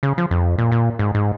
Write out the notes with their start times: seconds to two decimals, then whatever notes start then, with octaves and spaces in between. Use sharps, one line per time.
0.03 C#3
0.18 F3
0.31 F2
0.58 A#2
0.72 A#2
0.99 G#2
1.15 G#2